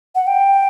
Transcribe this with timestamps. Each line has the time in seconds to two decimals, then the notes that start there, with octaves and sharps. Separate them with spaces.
0.15 F#5
0.27 G5